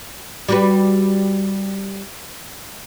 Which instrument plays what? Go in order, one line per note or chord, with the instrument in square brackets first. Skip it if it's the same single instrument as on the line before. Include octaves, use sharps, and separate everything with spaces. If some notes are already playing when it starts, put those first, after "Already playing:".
[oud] G3 F#4 B4